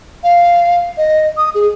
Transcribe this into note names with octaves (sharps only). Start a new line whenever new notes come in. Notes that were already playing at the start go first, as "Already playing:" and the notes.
F5
D#5
D#6
G#4